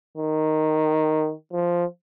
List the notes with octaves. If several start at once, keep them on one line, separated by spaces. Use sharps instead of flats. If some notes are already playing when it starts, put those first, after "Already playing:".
D#3
F3